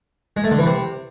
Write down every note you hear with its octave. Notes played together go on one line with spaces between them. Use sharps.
G#3
A3
D3
E3
C3